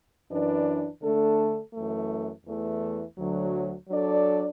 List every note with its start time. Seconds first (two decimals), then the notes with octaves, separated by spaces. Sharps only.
0.29 F#2 E3 D4 B4 D5
1.01 D3 A3 D4 A4
1.73 F#2 E3 A3
2.45 E2 E3 A3
3.17 D2 D3 F#3
3.89 F#3 D4 A4 D5